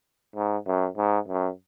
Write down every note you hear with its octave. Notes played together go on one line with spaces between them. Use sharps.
G#2
F#2
G#2
F#2